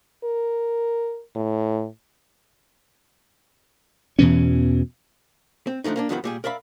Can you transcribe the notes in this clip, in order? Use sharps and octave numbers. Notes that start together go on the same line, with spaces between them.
A#4
A2
E2 B2 E3 C#4
C4
D3 D#3 F3 A3 D#4
A#3 C#4 D4
F2 D#3 F3 G3 G#3 B3
A#2 G3 G#4
A#4 D5 E5 F5 B5